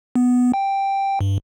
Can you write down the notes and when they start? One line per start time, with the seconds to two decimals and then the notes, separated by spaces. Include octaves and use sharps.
0.16 B3
0.54 G5
1.21 G2